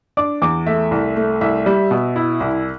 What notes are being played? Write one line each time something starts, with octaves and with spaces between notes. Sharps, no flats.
D4 D6
E2 D6
A3 E5
C2
A3
C2 E5
G3
B2
E4
C2